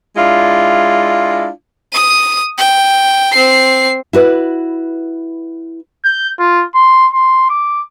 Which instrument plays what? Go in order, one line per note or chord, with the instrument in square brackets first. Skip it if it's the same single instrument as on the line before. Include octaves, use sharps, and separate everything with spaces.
[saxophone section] G#3 D4 E4 F4
[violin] D#6 D#7
G5
C4 C7
[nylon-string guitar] E4 F#4 B4
[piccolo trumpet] G6
F4
C6
C6
D6